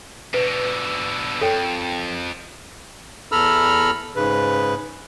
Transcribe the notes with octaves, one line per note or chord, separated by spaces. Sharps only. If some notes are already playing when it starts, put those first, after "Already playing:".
B2 D3 B4
F2 A4 C#5 G5
E2 A4 A#5 B5 E6 F6
G#2 C#3 B4